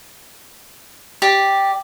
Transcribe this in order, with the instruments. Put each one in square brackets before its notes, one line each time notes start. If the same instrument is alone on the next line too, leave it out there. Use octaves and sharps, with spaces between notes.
[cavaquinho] G4 D5